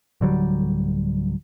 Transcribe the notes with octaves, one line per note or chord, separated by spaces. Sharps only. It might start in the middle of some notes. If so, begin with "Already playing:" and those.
D1 D3 F#3 G3